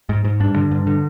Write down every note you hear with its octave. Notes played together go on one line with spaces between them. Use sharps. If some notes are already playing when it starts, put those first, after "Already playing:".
G#2
G#2
G2 D4
D3
G2
D3